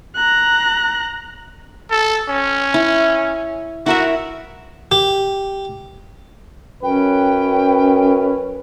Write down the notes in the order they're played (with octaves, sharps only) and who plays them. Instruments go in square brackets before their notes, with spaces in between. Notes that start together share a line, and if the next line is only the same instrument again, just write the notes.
[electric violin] A#5 F#6
[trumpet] A4
C#4
[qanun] E4
[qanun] E4 A#4 E5 [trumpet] F#4
[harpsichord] G4
[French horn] F#2 [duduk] C#4 [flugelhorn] B4 [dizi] G5